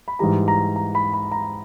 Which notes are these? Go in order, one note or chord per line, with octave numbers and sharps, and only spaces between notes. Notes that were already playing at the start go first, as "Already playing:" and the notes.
B5
G#2 E3 G3 A#5
A#5
A#5
B5
B5
A#5